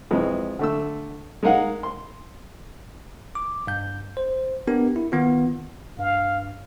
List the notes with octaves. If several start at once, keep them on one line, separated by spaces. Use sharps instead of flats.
F2 E3 G#3
D3 A3 E6
G#3 D#4 A#4 F5 F#5
C6
D6
G2 G6
C5
B3 D4 G4 A#4
E4
D#3 B3 F4
G2 F5